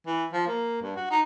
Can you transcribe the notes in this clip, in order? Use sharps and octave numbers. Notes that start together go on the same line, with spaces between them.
E3
F3
A#3
G2
F#4
D#4